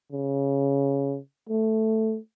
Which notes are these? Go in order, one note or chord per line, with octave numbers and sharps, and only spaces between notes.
C#3
A3